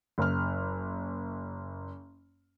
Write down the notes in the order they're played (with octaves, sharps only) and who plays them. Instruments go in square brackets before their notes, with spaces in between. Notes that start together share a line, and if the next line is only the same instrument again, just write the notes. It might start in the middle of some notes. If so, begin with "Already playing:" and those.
[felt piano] F#1 F6